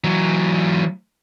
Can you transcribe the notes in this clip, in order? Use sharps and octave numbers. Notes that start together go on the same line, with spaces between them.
E3 F#3